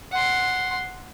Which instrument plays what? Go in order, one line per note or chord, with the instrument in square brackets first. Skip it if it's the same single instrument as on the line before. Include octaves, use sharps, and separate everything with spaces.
[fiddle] F#5 C6